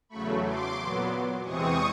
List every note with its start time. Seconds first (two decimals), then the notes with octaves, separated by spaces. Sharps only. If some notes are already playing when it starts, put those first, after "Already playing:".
0.09 E2 C#3 F#3 A3 B5 C#6
0.43 C6 D6
0.77 A#2 F#3 B3
1.43 E2 C3 E3 G#3 C4 C#6 D#6